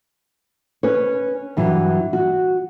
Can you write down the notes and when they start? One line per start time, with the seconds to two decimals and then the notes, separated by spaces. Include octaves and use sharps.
0.83 C#4 B4 C#5
1.57 G2 E3 F#3
2.13 F#4